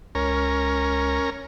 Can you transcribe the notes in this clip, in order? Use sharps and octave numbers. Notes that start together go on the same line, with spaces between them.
C#2 C#4 A#4